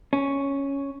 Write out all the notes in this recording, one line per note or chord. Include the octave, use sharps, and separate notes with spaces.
C#4